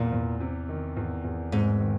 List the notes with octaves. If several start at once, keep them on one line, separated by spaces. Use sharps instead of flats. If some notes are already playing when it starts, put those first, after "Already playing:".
Already playing: E2 A#2
E2
C3
D#3
E2
E2
G#2 C3
D#3